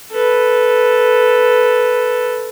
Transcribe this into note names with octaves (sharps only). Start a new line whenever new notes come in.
A4 B4